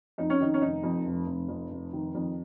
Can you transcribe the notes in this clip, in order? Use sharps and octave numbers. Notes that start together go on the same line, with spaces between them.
F2 D#4
C#4
D#3 D#4
C#4
F1 D#4
F2
F1
F1
F2
F1
D#3
F2